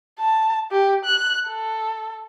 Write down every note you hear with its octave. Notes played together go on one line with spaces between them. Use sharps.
A5
G4
F#6
A4